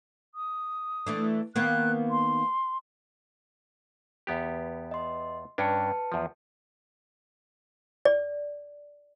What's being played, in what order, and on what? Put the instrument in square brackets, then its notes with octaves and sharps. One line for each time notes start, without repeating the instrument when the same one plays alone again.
[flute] D#6
[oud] E3 A3 D4
[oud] D#3 A#3 B3 [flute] F#6
[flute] C6
[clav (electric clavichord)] E2 B3 G4
[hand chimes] D#5 C6
[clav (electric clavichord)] G2 C#4 D4 [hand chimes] B4 A5 C#7
[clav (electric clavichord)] E2 F3
[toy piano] D5